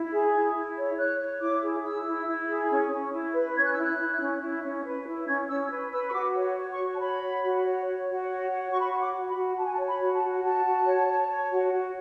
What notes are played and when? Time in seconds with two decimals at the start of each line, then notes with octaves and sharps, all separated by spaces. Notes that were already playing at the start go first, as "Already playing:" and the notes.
Already playing: E4
0.12 G#4
0.34 E4
0.54 E4
0.76 C#5
0.98 C#5 F#6
1.20 C#5
1.40 E4 D6
1.62 G#4
1.83 E4 E6
2.05 E4
2.27 E4
2.48 G#4
2.70 C#4
2.91 C#4
3.13 E4
3.34 B4
3.55 C#4 G#6
3.65 F#6
3.73 E6
3.77 E4 F#6
3.98 E4
4.20 C#4
4.41 E4
4.63 C#4
4.84 B4
5.06 E4
5.28 C#4 G#6
5.48 C#4 E6
5.70 B4
5.91 B4 E6
6.08 C#6
6.13 F#4 D6
6.35 C#5
6.57 C#5
6.71 C#6
6.78 F#4
6.95 A5
7.00 C#5 B5
7.21 C#5
7.42 F#4
7.64 C#5
7.85 C#5
8.07 F#4
8.28 C#5
8.50 F#4
8.71 F#4 C#6
8.80 B5
8.90 F#4 C#6
8.99 D6
9.14 F#4
9.28 B5
9.36 F#4
9.57 F#4 A5
9.65 G#5
9.73 A5
9.78 C#5
9.86 B5
10.00 F#4
10.14 A5
10.22 F#4
10.43 F#4 A5
10.64 F#4
10.86 C#5
11.08 C#5
11.29 C#5
11.51 F#4
11.72 F#4